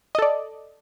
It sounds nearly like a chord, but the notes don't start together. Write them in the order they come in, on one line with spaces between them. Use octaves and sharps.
D#5 A4 D5